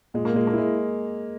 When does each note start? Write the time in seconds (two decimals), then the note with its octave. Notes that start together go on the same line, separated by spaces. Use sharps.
0.14 A#2 G#3
0.25 A#3
0.33 A#2 G#3
0.47 A#3
0.53 G#3 E4